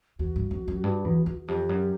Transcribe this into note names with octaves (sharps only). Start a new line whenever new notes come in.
E2 F#4
G2
F2
F#2
G2
E2
E2
F2 G4
F#2